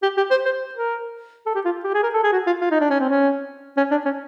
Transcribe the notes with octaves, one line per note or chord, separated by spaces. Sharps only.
G4
G4
C5
C5
A#4
A4
G4
F4
G4
G#4
A#4
A4
G#4
F#4
F4
F4
D#4
D4
C#4
C4
C#4
C#4
D4
C#4